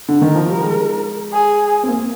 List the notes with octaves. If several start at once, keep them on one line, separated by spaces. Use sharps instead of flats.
D3
D#3 A#4
F3
G3
G#3
G#4
C4
A#3